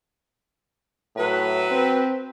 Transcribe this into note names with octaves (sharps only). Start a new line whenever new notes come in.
A2 F#3 B4
C4